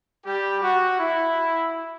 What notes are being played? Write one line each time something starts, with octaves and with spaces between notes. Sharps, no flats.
G3 G4
F#4
E4